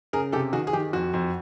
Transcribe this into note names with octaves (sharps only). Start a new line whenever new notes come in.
C#3 G#4 A#4
C3 G4 A4
D#3 F#4 G#4
G#4
D#3 G4
F2 F#4
F2